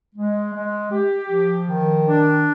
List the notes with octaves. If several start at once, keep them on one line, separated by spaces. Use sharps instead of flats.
G#3
G#3
G4
F3
D#3
D4